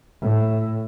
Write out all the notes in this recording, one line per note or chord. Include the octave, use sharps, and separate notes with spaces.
A2